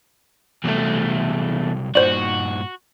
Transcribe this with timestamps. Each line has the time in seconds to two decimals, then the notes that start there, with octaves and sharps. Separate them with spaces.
0.64 E2 C3 F#3 G3 A3
1.95 G2 A#2 D#4 F#4 C5 D5